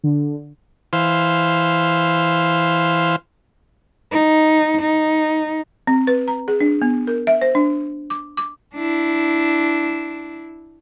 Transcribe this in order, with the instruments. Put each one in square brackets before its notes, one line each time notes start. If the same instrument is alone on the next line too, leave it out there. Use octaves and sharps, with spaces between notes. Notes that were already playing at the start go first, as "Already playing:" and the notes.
[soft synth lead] D3
[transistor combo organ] E3 C5 F5
[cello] D#4
D#4
[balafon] C4
B4
A#5
G#4
D4
B3
A#4
E5
C5
D4
D6
D6
[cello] D4 E4